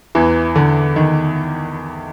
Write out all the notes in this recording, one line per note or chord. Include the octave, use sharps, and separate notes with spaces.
E2 E3
D3
D#3